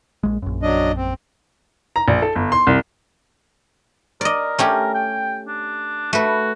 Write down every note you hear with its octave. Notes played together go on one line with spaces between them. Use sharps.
A#1 G#3
A#1 F#2
F#3 D4 D#5
C4
A#5
A#1
A4
G1
C6
C2
A#4 D5 D#5
A3 C#4 G4
G5
D4
A3 F#4 B4